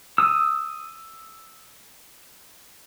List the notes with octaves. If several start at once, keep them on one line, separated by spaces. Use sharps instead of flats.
D#6 E6